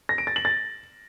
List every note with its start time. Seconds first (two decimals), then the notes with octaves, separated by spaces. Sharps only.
0.09 A#6
0.18 D7
0.27 A6
0.36 F#7
0.45 A6